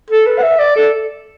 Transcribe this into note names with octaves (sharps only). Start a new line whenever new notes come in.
A4
B4
F#5
E5
D5
A4